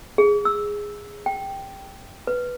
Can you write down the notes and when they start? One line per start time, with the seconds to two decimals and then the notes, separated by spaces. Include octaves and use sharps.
0.18 G#4
0.45 E6
1.26 G5
2.27 B4